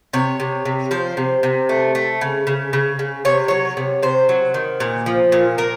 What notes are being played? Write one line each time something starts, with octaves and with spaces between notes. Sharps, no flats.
C3 C#5
C3
C3
F3 C5
C3
C3
A3
A3
C#3
C#3
C#3
C#3
C3 C#5
F#3 C#5
C3
C3 C5
F#3
D#3
A#2
F3
A#2
A#2 A#4